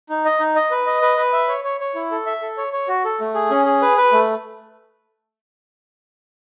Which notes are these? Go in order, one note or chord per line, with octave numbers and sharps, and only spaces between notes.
D#4
D#5
D#4
D#5
B4
D#5
B4
B4
E5
C#5
C#5
C#5
E4
A4
E5
A4
C#5
C#5
F#4
A4
A3
G#4
C#4
G#4
B4
B4
A3